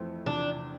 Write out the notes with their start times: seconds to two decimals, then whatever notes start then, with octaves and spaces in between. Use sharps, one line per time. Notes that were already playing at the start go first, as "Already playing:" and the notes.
Already playing: F2 E3 A3 C4
0.26 E2 C3 F3 D4